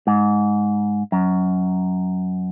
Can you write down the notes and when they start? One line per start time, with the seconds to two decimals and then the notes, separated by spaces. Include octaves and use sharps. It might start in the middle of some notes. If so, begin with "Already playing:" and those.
0.07 G#2
1.12 F#2